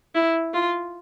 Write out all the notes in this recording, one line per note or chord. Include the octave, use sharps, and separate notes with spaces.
E4
F4